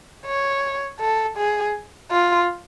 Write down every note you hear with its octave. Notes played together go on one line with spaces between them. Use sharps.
C#5
A4
G#4
F4